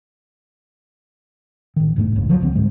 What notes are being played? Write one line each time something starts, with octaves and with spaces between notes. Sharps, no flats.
A1 D#3
E1 G#2 G3 A3
F#1 C#2 C#3
D3 F3 F#3
C#2 D3 C4
G#2 G#3